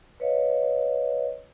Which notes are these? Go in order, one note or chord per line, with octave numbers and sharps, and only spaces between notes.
B4 C#5 D#5 F5